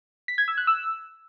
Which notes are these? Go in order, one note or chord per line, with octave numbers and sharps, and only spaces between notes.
B6
G#6
E6
F#6
E6